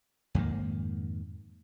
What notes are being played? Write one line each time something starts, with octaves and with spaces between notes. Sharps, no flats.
F2 G#2 D#3 A#3